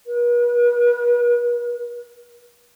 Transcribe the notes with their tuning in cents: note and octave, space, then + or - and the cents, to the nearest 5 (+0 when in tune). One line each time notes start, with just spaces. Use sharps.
B4 -45